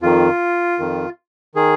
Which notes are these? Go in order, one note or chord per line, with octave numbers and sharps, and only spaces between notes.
F2 D#3 F4
F2 D#3
D#3 G#4